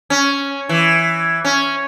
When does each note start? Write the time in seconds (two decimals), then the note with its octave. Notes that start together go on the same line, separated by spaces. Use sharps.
0.10 C#4
0.69 E3
1.45 C#4